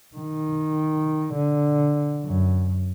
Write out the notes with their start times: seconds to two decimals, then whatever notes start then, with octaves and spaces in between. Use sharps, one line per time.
0.16 D#3
1.34 D3
2.25 F#2